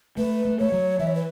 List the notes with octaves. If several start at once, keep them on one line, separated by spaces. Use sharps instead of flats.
A3 B4
A3
A3 C#5
F#3
E3 E5
C#5
B4